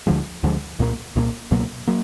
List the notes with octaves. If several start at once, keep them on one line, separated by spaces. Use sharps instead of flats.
D2 D3 F3 G#3
D2 D3 F3 G#3
C2 A#2 F3 A#3
C2 A#2 F3 A#3
C#2 B2 F#3 A#3
F#3 A#3